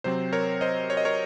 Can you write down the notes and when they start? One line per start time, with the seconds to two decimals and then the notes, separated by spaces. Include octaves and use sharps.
0.04 C3 F#3 C4 C5
0.33 A#4 C#5
0.61 C5 D#5
0.90 C#5
0.97 D#5
1.05 A#4 C#5